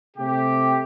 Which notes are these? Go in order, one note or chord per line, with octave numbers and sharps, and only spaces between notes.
C3 A3 G4